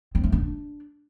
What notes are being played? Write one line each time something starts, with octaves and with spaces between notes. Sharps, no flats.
C4
A3
C#4
D4